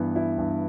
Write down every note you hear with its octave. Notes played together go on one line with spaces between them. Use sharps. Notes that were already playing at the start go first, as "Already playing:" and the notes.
Already playing: G2 E3 B3 E4
E4
G2